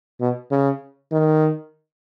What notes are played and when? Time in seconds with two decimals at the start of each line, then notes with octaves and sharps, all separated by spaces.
0.21 B2
0.51 C#3
1.12 D#3